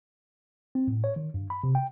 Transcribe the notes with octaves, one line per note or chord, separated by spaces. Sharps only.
C4
A2
C#5
D#3
G2
B5
C3
G5